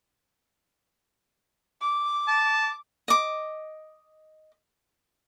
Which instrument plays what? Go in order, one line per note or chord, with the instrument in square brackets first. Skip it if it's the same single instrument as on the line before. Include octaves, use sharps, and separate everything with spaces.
[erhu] D6
[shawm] A5
[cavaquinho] D#5 D6